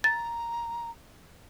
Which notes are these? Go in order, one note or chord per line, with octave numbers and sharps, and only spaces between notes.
A#5 A6